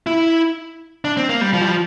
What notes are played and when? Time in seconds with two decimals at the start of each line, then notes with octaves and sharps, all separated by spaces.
0.07 E4
1.05 D4
1.17 C4
1.29 A#3
1.41 G3
1.53 F3
1.61 G3
1.68 F3